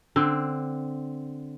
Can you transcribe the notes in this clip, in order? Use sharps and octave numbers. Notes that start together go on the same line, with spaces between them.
D3 C4